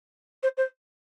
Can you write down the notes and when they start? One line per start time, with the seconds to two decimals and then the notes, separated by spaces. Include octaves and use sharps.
0.43 C5
0.57 C5